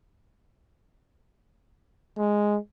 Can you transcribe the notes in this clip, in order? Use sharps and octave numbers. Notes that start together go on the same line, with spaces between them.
G#3